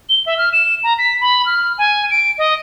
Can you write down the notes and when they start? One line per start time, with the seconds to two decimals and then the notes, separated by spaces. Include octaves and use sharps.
0.09 G7
0.26 E5
0.38 F6
0.53 E7
0.83 A#5
0.98 B6
1.21 B5
1.46 F6
1.78 G#5
2.11 D7
2.38 D#5